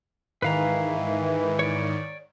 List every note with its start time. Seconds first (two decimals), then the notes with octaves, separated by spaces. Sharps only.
0.42 G#2 D#3 E3 B4 F5 A#5
1.59 C#5 D5